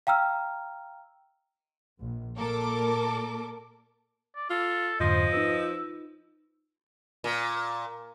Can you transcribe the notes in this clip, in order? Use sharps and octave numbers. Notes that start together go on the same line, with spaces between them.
F5 G5 A#5 E6 F6
A#1
A#2 A4 A#4 D6
D5
F4 A4
F2 G#2 D3 F3 C5 D#5
D#4 F4 B4 E6
A#2